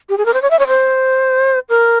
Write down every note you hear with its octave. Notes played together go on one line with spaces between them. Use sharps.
G4
G#4
A#4
C5
C#5
E5
C#5
C5
A#4